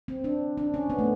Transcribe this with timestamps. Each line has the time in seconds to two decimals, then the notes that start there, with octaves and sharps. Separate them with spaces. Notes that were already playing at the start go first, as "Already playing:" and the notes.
0.08 C4
0.24 D4
0.57 D4
0.74 C#4
0.90 B3
0.99 A3